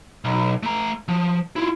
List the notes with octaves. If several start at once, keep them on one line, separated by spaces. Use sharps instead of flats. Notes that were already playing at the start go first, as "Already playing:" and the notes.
B1
A3 A#5
F3
E4 F4